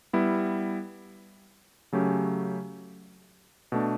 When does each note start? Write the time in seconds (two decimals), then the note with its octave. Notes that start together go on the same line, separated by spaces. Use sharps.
0.13 G3 B3 E4
1.92 C#3 F#3 A3 C#4 G4
3.72 B2 A3 D4